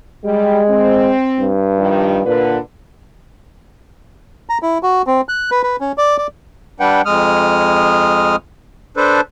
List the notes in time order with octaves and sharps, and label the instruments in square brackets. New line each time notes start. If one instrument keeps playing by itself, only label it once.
[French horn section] G3 G4 [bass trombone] G#3
[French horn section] C4
[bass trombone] G2
[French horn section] D#3 F3 G3
[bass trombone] A#2 [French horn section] D3 B4
[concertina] A#5
E4
F#4
C4
F#6
B4
B4
C#4
D5
D5
[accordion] G3 D4 B4 F#5 G5
F2 G#3 D#6 F6
D4 A4 B4 C5